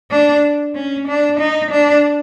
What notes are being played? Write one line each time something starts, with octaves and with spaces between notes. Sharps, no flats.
D4
C#4
D4
D#4
D4